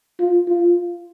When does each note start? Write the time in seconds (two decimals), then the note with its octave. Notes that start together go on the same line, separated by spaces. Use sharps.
0.20 F4
0.48 F4